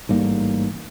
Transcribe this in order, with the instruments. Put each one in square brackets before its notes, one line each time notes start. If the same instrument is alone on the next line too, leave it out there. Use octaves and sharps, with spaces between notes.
[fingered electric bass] A1 G#2 G3 A#3